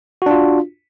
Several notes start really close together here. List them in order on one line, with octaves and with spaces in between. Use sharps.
F#4 D4 F4